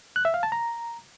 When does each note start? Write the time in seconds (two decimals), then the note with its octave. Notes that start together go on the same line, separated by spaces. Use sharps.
0.16 F#6
0.25 E5
0.34 F5
0.43 A5
0.52 A#5